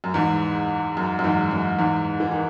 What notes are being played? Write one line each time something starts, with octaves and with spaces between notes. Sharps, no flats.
F#2
E2 G#2
F#2
F#2
E2 G#2
F#2
E2 G#2
E3
D#3